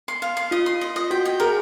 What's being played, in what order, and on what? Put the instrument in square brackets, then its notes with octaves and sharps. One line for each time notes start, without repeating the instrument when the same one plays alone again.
[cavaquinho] C6
F5
C6
[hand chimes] F4 [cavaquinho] D#5
[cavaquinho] C6
D#5
D#5
[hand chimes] F#4 [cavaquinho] G5
[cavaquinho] G5
[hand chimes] G#4 [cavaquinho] A#4